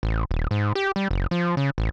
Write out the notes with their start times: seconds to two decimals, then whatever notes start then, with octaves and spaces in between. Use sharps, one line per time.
0.03 A1
0.31 D#1
0.51 G#2
0.75 G4
0.96 G3
1.11 F#1
1.31 F3
1.57 C#3
1.78 A1